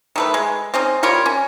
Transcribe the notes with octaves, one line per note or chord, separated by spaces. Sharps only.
D#3 A3 B4
G#3
C4 C#4 D#4
G3 F4 A#4 C#5
C#4